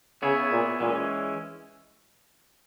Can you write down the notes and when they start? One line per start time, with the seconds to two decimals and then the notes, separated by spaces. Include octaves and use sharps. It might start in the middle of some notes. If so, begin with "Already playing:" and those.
0.22 C#3 B3 E4 G#4 C#5
0.52 A#2
0.80 A#2 E3 G#3 C#4